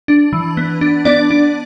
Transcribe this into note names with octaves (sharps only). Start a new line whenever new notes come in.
D4
E3
B3
D4
B3 D4 D5
D4